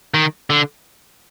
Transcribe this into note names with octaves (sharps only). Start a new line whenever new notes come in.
D#3
D3